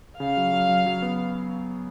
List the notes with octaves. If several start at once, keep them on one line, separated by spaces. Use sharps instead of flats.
C#3 F5
F#3
F#3
F#3
F#3
B3